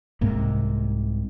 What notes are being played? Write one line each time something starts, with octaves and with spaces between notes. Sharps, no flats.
C2 G#2 C3 A#3